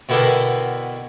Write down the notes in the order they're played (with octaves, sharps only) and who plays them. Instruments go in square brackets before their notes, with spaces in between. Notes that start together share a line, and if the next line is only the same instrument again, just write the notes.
[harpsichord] B2 D3 E4 G4 A4 A#4